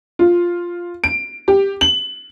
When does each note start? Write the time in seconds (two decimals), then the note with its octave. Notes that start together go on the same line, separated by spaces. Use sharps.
0.19 F4
1.04 D7
1.48 G4
1.81 F#7